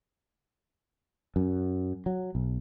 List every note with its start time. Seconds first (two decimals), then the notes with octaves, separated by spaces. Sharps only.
1.36 F#2
2.06 F#3
2.35 B1